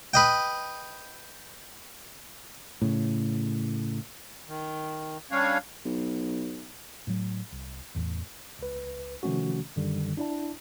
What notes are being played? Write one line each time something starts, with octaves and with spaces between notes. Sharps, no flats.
B4 D#5 G5
A2 C#3
D#3
G3 C#4 D4 C#5 F5
B1
A2 F#3
C2
A1 E2 A2 E3
C#2 B4
C3 D#3 F3 A3 C#4 F#4
F#2 D3 D#3 G3
D4 E4 D5 A5